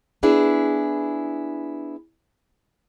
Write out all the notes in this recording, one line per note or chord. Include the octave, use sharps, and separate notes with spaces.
B3 D4 E4 G#4